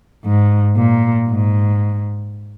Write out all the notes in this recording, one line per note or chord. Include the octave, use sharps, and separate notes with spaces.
G#2
A#2
G#2